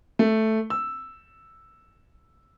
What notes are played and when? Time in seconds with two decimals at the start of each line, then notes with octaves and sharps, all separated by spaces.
0.19 A3
0.70 E6